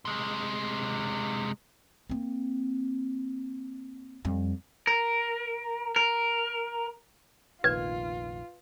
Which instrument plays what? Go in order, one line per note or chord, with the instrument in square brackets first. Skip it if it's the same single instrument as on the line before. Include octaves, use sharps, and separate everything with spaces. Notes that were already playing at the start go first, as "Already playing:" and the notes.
[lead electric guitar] C3 G#3
[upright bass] A#3 C4
F2 G3
[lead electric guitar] A#4
A#4
[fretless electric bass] F1 A#1 D#3 [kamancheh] F4 [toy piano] B4 [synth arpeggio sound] G#6